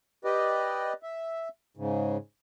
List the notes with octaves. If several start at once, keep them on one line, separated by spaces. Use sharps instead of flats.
G4 B4 D5 D#5
E5
G#2 C#3